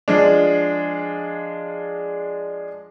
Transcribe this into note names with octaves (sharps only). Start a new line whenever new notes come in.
F3 G#3 D4